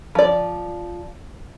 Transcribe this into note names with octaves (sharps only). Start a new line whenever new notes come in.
F3 D5